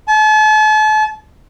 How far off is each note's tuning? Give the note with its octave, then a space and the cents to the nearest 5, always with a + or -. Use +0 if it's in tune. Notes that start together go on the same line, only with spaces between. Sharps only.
A5 -40